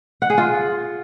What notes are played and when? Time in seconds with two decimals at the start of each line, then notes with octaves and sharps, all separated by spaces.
0.22 F#5
0.30 G#4
0.38 F4